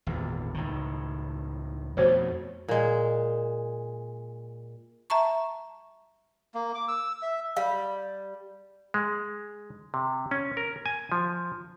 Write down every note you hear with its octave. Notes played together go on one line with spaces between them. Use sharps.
G#1 E2 A#2
C#2 A2 D#3
F2 B2 A3 F#4 C5 C#5
A#2 G#3
E5 A5 A#5 C#6
A#3
D6
E6
E5
G3 F5
G#3
C3
C#4
A#4
G#5
F3